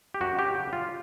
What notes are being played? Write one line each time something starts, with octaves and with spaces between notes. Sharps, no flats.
G4
F#2 F#4
G4
C#3 F#3
F4